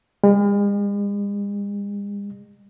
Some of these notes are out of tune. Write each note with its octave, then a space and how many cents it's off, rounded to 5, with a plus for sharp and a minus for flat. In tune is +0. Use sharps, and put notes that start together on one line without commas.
G#3 -45